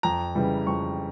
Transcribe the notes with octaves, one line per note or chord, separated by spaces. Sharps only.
F2 A#5
C#3 E3 G3
F2 C#6